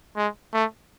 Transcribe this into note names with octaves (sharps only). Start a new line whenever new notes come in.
G#3
A3